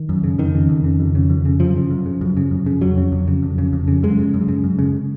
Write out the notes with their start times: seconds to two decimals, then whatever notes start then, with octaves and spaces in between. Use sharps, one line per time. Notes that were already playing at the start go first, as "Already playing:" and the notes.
Already playing: D#3
0.09 F#2
0.24 C#3
0.38 F2 D#3
0.54 C#3
0.69 F2
0.84 C#3
1.00 F2
1.15 C#3
1.30 F2
1.45 C#3
1.60 F#2 F3
1.76 C#3
1.91 F#2
2.06 C#3
2.21 F#2
2.37 C#3
2.51 F#2
2.66 C#3
2.81 F2 F#3
2.98 C#3
3.12 F2
3.28 C#3
3.43 F2
3.58 C#3
3.73 F2
3.88 C#3
4.03 F#2 G#3
4.19 C#3
4.34 F#2
4.48 C#3
4.64 F#2
4.79 C#3